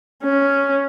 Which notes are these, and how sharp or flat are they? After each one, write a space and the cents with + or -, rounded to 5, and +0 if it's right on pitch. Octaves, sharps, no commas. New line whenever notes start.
C#4 +0